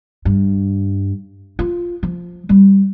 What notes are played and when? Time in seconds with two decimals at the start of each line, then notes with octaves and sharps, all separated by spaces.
0.25 G2
1.59 F4
2.03 F3
2.49 G3